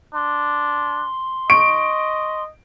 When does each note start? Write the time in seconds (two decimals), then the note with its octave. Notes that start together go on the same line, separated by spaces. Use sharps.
0.14 D4 C6
1.50 D#5 C#6 D7